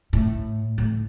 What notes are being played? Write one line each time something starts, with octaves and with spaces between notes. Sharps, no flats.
A2
A2